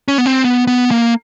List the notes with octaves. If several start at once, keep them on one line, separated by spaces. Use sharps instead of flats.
C#4
B3
C4
B3
B3
A#3